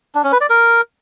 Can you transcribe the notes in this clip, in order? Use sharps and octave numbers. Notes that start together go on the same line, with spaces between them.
D4
C#4
B4
D5
A#4